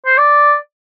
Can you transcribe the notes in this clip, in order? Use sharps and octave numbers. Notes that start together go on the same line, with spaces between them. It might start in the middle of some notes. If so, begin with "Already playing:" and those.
C5
D5